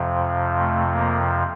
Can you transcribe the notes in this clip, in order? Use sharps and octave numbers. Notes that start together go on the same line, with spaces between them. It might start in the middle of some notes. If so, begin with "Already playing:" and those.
Already playing: F2 C3 F3
A3
A#3